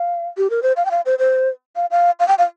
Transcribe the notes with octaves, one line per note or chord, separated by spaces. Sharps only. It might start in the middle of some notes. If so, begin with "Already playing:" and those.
Already playing: F5
G4
A#4
C5
F5
G5
F5
C5
C5
F5
F5
F5
G5
F5